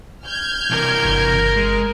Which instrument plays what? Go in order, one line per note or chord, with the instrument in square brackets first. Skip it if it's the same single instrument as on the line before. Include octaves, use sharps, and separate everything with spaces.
[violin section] F6 G6 G#6
[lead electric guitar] C3 E3 [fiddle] A#4
[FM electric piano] G1
[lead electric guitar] G#3